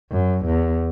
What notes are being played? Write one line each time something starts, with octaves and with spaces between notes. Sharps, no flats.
F#2
E2